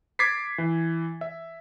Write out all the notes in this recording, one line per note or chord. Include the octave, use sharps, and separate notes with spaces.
D6 G#6 A6 B6 C7
E3
E5